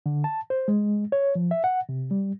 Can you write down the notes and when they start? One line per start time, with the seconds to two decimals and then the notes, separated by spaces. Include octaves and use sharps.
0.06 D3
0.24 A5
0.50 C5
0.68 G#3
1.12 C#5
1.35 F3
1.51 E5
1.64 F#5
1.89 C3
2.11 G3